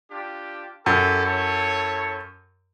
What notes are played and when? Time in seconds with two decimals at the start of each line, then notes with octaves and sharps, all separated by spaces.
0.11 D4 F4 G4
0.86 F#2 E4 G4 A4
1.26 E4 A4 C#5